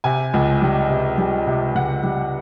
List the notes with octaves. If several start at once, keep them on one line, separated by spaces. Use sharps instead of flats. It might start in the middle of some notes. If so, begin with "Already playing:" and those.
C3 G#5
C#2
G3
C3
G3
C3
C#2 F#5
G3